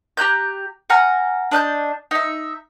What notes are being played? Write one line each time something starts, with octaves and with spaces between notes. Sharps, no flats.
G4 A#5 F#6 G6
F#5 G#5 A#5 F6
D4 D#5 F#6 G6
D#4 E5